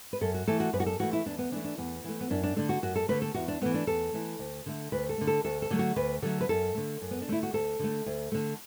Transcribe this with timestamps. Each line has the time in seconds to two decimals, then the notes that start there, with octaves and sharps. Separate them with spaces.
0.13 B4
0.21 F#2 A4
0.34 F#4
0.47 E3 A3 A4
0.60 F#4
0.73 F#2 B4
0.80 F#4
0.86 A4
1.00 E3 A3 F#4
1.13 E4
1.26 E2 D4
1.38 B3
1.52 E3 D4
1.56 A3
1.65 D4
1.78 E2 B3
2.04 E3 A3
2.21 B3
2.30 F#2 D4
2.43 D4
2.56 D3 A3 D4
2.69 F#4
2.82 F#2 F#4
2.96 A4
3.08 D3 A3 B4
3.22 A4
3.34 E2 F#4
3.48 D4
3.61 E3 A3 B3
3.74 D4
3.87 E2 A4
4.13 E3 A3
4.39 D2
4.66 D3 A3
4.92 D2 B4
5.09 A4
5.18 D3 A3
5.27 A4
5.44 D2 A4
5.62 A4
5.70 D3 F#3 A3
5.79 F#4
5.96 D2 B4
6.22 D3 F#3 A3 A4
6.41 B4
6.49 F#2 A4
6.75 D3 A3
7.01 F#2
7.11 B3
7.22 D4
7.28 D3 A3 E4
7.43 F#4
7.53 D2 A4
7.79 D3 A3
8.06 D2
8.32 D3 A3